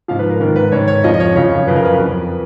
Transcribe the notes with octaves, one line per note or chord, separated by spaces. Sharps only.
G#2 F3 F5
B4
A#4
G#2 D#3 A#4
B4
G#2 D#3 C#5
C#5
F2 F3 D#5
D#5
C#5
F#2 C#3 F3 C#5
F#2 C#3 F3 B4
A#4
B4
F2 F3